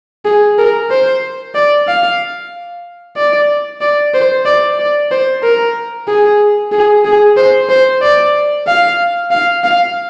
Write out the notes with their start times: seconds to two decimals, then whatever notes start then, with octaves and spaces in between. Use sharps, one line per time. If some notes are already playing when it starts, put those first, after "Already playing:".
0.25 G#4
0.58 A#4
0.91 C5
1.55 D5
1.88 F5
3.17 D5
3.81 D5
4.14 C5
4.46 D5
4.79 D5
5.11 C5
5.43 A#4
6.08 G#4
6.72 G#4
7.05 G#4
7.37 C5
7.69 C5
8.02 D5
8.67 F5
9.31 F5
9.64 F5